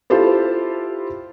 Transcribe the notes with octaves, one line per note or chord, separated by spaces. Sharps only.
E4 F4 G4 A4 C5